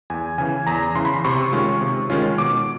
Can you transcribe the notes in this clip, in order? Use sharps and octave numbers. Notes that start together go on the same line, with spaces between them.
E2 G#5
C#3 E3 G#5
E2 A#5
C#3 E3 C6
B5
C6
C3 C#6
D#3 G#3 C#4 F4
C3
D#3 G#3 C#4 F4
B2 D6